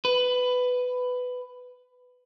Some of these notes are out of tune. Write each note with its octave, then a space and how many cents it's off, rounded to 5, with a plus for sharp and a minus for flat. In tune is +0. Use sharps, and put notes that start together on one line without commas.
B4 +15